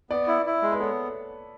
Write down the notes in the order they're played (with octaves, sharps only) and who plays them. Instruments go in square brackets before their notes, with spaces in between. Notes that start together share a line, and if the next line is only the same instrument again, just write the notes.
[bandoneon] B3 [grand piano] B4 D5
[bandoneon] E4
E4
G#3
[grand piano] B4
[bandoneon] B3 [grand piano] A4 C#5